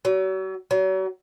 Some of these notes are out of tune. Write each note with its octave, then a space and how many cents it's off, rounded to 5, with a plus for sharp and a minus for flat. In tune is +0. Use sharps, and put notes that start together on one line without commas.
F#3 +40
F#3 +40